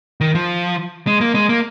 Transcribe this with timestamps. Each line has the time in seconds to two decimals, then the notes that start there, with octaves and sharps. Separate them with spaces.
0.21 D#3
0.35 F3
1.07 G#3
1.21 A#3
1.35 G#3
1.49 A#3